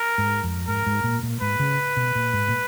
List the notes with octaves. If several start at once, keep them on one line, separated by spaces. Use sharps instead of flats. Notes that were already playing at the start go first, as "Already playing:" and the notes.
Already playing: A#4
G#2
F2
G#2 A#4
G#2
A#2
A#2
G#2 B4
C#3
B2
A#2
G#2
A#2